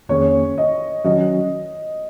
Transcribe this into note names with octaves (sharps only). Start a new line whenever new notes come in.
F2 D#3 A#3 C#4 G#4 C#5
D#5
D#3 F#3 C#4 F#4 D#5